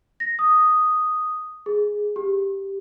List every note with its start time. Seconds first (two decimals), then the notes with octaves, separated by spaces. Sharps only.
0.20 A#6
0.39 D#6
1.66 G#4
2.16 G4